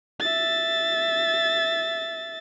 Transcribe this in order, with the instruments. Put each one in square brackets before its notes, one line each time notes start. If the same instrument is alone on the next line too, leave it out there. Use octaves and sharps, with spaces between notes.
[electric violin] E5 A6